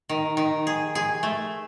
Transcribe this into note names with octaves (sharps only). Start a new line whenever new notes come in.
D#3
D#3
G#4
G#4
A3